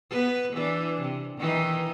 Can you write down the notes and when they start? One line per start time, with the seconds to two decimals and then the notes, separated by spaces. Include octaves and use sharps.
0.10 B3 B4
0.52 E3 D4
1.02 C3
1.37 D#3 E3 D#4